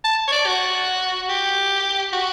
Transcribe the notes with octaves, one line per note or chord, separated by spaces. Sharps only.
A5
C#5
D5
F#4
G4
F#4